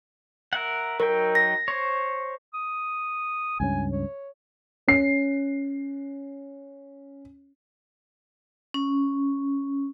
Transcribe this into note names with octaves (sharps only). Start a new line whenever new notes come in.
A#4 E5 F#5
F#3 D#4 A#4 G5
A#6
C5 C#5
D#6
C#2 G2 C#4 G#5
C#5
C#4 C7
C#4